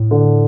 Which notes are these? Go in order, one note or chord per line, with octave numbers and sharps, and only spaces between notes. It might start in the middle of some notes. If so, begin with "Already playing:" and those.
Already playing: A2
D3